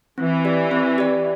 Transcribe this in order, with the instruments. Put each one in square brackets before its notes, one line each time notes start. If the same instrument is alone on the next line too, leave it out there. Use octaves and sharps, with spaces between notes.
[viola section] E3 [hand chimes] C4
[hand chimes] G4 D5
C4
G4 D5